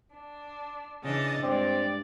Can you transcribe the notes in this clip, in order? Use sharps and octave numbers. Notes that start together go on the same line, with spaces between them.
D4
C#3 E3 D4 D#5 A6
G2 G#3 C4 D5